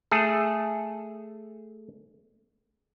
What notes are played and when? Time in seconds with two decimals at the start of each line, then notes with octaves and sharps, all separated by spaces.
0.11 A3 G#4 A4